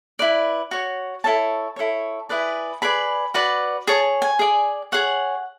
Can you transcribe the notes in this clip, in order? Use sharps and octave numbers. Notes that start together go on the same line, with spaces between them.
E4 B4 D5
F#4 C#5
E4 A4 C#5 A5
E4 A4 C#5
E4 G#4 B4 D5
G#4 B4 D5 B5
F#4 B4 D5
G#4 C#5 A5
G#5
G#4 D5
G#4 C#5 F#5